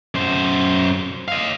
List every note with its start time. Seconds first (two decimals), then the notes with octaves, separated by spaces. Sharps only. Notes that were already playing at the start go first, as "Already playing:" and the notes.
0.15 F#2 C5
1.28 D#5 F5